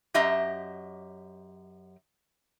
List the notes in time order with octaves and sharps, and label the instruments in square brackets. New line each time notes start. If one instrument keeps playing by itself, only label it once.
[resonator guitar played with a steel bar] F#2 G4 D#5 E5 A#5